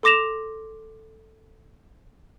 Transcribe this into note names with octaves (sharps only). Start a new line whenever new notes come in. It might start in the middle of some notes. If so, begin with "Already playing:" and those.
A4 C6 D6 A#6 E7 F7